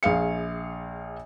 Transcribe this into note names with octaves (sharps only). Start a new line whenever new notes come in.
A#1 G#4 F5 C#7